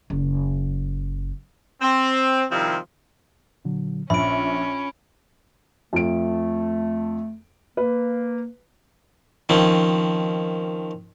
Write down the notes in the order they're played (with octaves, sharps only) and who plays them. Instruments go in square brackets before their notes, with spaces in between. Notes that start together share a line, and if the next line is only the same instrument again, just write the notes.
[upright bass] F#1
[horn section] C4
C3 D#3 F3 G3 C4 E4
[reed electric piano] A#2 D3 F#3
[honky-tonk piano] A#1 [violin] C#4 [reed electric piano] E5 [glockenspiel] B5 D7
[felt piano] F2 D7 [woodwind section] A3
[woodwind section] A#3 [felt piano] B4
[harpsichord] D#3 F3 C4 C#4